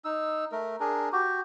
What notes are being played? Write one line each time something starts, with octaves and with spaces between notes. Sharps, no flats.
D#4 E6
A3 A#4
D4 G#4 A#4
F#4 G4